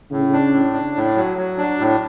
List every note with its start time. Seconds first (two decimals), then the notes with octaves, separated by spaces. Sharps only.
0.11 A2 C#3
0.33 D4
0.53 A2
0.74 D4
0.96 A2
1.16 F#3
1.37 F#3
1.58 D4
1.79 A2